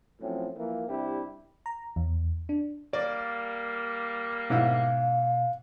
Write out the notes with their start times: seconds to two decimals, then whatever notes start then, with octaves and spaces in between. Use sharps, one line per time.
0.21 A2 F3 F#3 C4 C#4
0.57 E3 F3 A#3
0.88 C3 G3 D4 E4 G4
1.66 A#5
1.96 E2
2.49 D4
2.93 G3 A#3 D5
4.50 G#2 B2 E4 F5